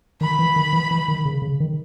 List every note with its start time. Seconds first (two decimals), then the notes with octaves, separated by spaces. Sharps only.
0.21 D#3 B5
0.39 E3
0.56 D#3
0.73 E3
0.91 E3
1.08 D#3
1.25 C#3
1.42 C#3
1.60 D#3